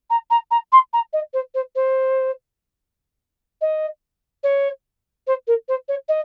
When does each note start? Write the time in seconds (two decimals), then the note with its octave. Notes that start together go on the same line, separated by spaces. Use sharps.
0.10 A#5
0.31 A#5
0.51 A#5
0.72 C6
0.93 A#5
1.13 D#5
1.34 C5
1.55 C5
1.75 C5
3.61 D#5
4.44 C#5
5.27 C5
5.47 A#4
5.68 C5
5.88 C#5
6.09 D#5